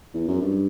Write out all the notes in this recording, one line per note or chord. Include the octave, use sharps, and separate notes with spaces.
E2
F#2
G2